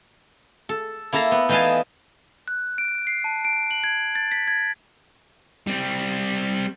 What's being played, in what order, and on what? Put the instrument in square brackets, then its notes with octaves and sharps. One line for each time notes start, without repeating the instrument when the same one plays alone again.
[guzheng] A4
A#3 E4 A4 F5 A#5
B3
E3 D#4 B4 F5 G#5 A5
[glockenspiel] F#6
D7
C7
A5
D7
F#7
G#6
A6
B6
G#6
[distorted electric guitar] G3 C4